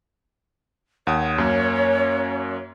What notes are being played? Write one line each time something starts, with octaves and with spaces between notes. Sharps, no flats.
D#2 C#5 F#5 D#6
F#2 A#3 C#4